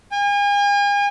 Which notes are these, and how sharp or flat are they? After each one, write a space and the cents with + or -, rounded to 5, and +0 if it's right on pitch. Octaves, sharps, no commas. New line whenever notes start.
G#5 -40